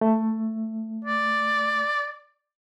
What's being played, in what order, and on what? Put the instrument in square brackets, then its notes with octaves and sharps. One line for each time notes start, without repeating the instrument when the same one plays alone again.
[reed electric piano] A3
[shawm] D5